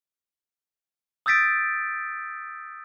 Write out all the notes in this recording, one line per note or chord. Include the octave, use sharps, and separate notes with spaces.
D#6 E6 G6 A6 B6 D7